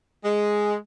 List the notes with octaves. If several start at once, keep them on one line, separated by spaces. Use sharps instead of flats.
G#3